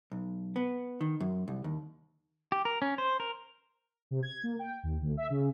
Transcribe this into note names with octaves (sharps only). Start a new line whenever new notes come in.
B1
B3
D#3
F#2
C2
D#2
G4
A#4
C#4
C5
A#4
C3
G#6
A#3
G5
D#2
D2
E5
C#3